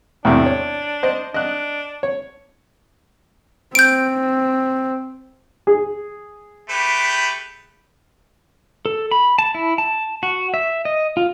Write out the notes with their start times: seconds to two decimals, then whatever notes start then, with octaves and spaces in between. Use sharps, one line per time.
0.25 E2 A2 C3 D4
0.46 C#5
1.03 C5 D#5
1.34 D4 D#5 F#6
2.03 C#5
3.75 C4 G6 D7
5.67 G#4
6.69 A3 G4 B4
8.86 A4
9.11 B5
9.39 A5
9.55 E4
9.78 A5
10.23 F#4
10.54 E5
10.85 D#5
11.17 F4